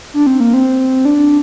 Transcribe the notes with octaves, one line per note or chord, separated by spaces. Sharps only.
D4
C4
A#3
C4
D4